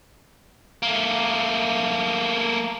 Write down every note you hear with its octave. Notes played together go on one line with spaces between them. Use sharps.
A3 A#3